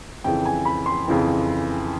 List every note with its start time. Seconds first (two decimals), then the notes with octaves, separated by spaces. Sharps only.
0.24 F2 C#3 E3 G5
0.45 G#5
0.65 B5
0.86 C6
1.08 F2 C#3 E3